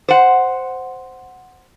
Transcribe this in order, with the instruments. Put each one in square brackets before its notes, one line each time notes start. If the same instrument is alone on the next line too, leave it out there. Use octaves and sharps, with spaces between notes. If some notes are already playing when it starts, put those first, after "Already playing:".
[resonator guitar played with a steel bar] C5 F#5